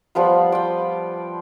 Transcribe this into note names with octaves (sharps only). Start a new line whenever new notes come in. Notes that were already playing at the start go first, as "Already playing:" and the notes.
F3 G3 B3 F4
D5 G5